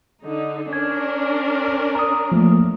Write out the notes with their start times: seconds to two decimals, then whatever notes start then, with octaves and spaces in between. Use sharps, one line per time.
0.23 D3 D#4
0.73 C#4 D4 A#4 G#6
1.95 A#5 D#6
2.32 F3 A3 A#3